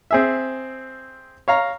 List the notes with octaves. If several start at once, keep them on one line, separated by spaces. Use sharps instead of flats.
C4 G#4 E5
C#5 F5 A#5